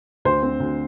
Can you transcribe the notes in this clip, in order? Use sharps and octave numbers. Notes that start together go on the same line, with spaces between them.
D2 C5
C4
D2